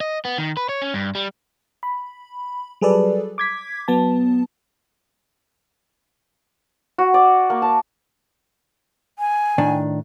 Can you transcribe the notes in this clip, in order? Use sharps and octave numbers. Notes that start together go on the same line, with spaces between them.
D#5
B3
D#3
B4
C#5
C#4
G2
G3
B5
F#3 G3 G#4 A4 B4 D5
D6 G#6 B6
F#3 B3 A5
F#4
D5
A#3
A5
G#5
A2 D#3 D4